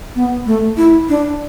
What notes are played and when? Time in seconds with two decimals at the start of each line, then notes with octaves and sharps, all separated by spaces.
0.16 B3
0.46 A3
0.77 E4
1.09 D4